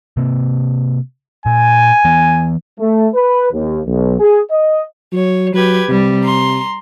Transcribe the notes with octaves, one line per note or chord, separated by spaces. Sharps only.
C3 A#3 C4
A#2 G#5
E3 B3
A3
B4
D#2
B1
G#4
D#5
F#3 C#5
F#3 G4 B4 G#6
C3 G3
A#5 C6